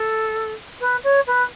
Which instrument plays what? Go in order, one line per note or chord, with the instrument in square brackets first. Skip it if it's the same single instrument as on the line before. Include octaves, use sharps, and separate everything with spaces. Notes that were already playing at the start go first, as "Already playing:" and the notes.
Already playing: [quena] A4
B4
C#5
B4